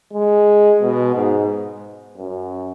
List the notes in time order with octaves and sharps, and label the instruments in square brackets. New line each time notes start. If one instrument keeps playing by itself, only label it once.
[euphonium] G#3
B2
G#2
F#2